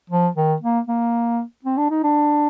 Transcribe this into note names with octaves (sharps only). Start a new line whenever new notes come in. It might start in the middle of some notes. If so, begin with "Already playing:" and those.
F3
D#3
A#3
A#3
C4
D4
D#4
D4